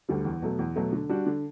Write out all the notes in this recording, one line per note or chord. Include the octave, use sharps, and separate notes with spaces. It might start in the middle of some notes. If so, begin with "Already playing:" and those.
D2 D3 G3
E2
B2 F#3 A3
E2
B2 F#3 A3
D3
G3 D4 F#4
D3